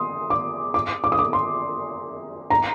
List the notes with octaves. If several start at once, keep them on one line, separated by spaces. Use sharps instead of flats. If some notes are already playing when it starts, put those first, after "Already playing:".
Already playing: C6 D#6
D6
D6
D6
D#6
D6
C6
A#5